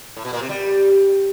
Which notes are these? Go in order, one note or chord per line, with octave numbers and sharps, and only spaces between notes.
A2
B2
A#2
C3
G3